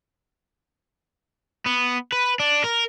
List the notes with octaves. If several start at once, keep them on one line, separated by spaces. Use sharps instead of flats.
B3
B4
D4
A#4